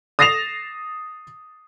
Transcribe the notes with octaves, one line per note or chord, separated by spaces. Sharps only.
D#6 A6 A#6 C7 E7 F7